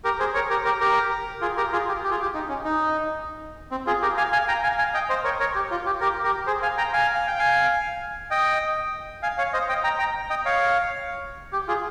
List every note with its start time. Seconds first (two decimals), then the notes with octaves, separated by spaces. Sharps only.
0.04 G4 A#4
0.19 G#4 C5
0.34 A#4 C#5
0.50 G4 A#4
0.65 G4 A#4
0.80 G4 A#4
1.41 F4 G#4
1.57 G4 A#4
1.72 F4 G#4
1.88 G4
2.04 G4
2.11 F4 G#4
2.22 G4
2.34 D#4
2.49 C#4
2.65 D#4
3.71 C4
3.87 F4 G#4
4.02 G4 A#4
4.17 F5 G#5
4.32 F5 G#5
4.48 G5 A#5
4.63 F5 G#5
4.78 F5 G#5
4.94 D#5 G5
5.09 C5 D#5
5.24 A#4 C#5
5.40 A#4 C#5
5.55 G4
5.71 F4
5.86 G4
6.01 G4 A#4
6.24 G4 A#4
6.47 G#4 C5
6.62 F5 G#5
6.78 G5 A#5
6.93 F5 G#5
7.14 F5
7.27 G5
7.39 F5 G#5
8.31 D#5 G5
9.23 F5 G#5
9.38 C#5 F5
9.53 C5 D#5
9.69 D#5 G5
9.83 G5 A#5
9.99 G5 A#5
10.30 D#5 G5
10.45 C#5 F5
11.53 G4
11.68 F4 G#4